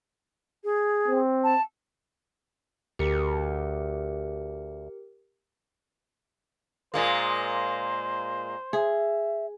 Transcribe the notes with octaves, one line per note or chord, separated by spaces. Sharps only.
G#4
C4
A5
D2 G4 A#4 C#7
A#2 G#3 A#3 C5
G#4 E5